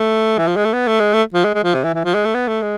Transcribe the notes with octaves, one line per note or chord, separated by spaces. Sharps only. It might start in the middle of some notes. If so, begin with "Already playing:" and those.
Already playing: A3
E3
F3
G#3
A3
B3
A3
G#3
A3
F3
G#3
G#3
F3
C3
E3
E3
F3
G#3
A3
B3
A3
G#3